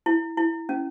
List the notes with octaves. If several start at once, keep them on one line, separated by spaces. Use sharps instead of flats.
E4
E4
C#4